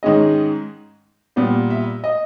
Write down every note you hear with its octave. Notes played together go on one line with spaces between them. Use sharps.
G#2 D#3 G#3 C#4 D#5
A#2 G3 B3 D5
E5
D#5